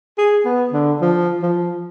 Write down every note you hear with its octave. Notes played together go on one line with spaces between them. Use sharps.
G#4
B3
D3
F3
F3